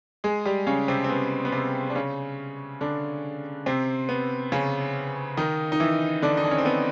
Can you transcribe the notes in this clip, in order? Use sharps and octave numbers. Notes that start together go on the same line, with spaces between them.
G#3 G#4
G3 G4
C#3 C#4
C3 C4
C4
B3
B3
C3 C4
D4
C#3 C#4
D3 D4
C3 C4
B3
C#3 C#4
D#3 D#4
D#4
E3 E4
D3 D4
D#4
D4
C#4
C4
B3